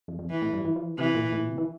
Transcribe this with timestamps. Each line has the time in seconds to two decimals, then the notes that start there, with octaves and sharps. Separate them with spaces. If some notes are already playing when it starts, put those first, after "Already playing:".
0.08 F2
0.19 F2
0.30 E3
0.42 A2
0.53 G2
0.65 E3
0.76 F3
0.86 E3
0.98 C3 E3
1.15 A#2
1.32 A2
1.41 A#2
1.49 C3
1.58 E3